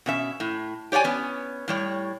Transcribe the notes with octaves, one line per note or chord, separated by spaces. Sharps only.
B2 C#4 E5
A2
G4 C#5 D5 F#5 G#5
B3 C#4
A2 G3 C#5